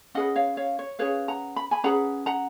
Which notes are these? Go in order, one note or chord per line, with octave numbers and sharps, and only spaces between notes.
C#4 G#4 B4 D#5 F#5
C#5 F5
C#5 F5
C#5
C#4 G#4 B4 C#5 F5
F#5 A#5
B5
G#5 B5
C#4 G#4 B4 F#5 A#5
F#5 A#5